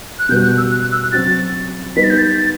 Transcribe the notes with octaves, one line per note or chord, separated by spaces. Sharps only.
F#6
B2 G3 B3 F#4 G6
F#6
E6
F#6
F#6
E6
F#6
F#3 C4 F#4 A6
G3 B3 D#4 B6
A6
G6
A6